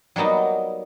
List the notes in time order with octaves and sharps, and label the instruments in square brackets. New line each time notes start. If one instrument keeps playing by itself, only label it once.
[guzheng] F#3 G3 A#3 B3 D#4